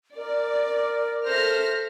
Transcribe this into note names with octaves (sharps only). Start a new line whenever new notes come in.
A#4 D5
A4 C5 E5 F6 A#6